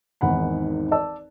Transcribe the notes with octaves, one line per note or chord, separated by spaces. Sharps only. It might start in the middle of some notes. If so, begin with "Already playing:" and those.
G#1 E2 D#3 F#5 B5
D5 A5 E6